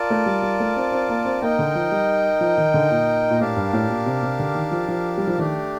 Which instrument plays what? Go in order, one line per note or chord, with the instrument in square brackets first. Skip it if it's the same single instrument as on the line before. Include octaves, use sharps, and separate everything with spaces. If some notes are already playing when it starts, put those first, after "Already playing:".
Already playing: [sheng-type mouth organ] F4 A#4 D5 A5
[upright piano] A3
G3
G3
A3
C4
C4
A#3
C4
[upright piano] A#3 [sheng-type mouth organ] D#4 A#4 D#5 G5
[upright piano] D3
F3
G3
F3
D#3
D3
A#2
A#2
[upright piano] A2 [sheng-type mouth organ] D4 G4 A#4 F5 A5
[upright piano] G2
A2
A#2
C3
C3
D3
D#3
F3
F3
G3
F3
[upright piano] D#3 [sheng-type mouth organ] A3 D4 G4